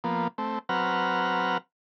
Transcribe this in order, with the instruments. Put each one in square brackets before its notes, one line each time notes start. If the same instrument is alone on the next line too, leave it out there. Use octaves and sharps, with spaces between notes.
[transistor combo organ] F3 A#3 B3
A3 C4
F#3 C4 B4 F#5 A#5 F6